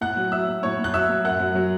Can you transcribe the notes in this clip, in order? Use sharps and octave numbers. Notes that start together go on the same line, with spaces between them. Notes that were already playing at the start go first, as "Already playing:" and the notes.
A2 F#5 F#6
F#3
F#3 E5 E6
F#3
A2 C#5 C#6
A2
F#6
F#3 E5 E6
F#3
F#2 F#5 F#6
F#3
F#3